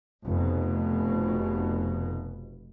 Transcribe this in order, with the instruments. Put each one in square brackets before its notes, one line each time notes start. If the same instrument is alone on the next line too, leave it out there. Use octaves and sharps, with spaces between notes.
[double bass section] F1 B2